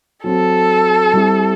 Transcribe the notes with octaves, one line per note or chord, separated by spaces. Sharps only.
F#3 C4 F#4 A4
G3 C4 E4 G4